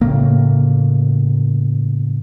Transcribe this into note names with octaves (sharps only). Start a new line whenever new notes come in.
A2 C#3 A#3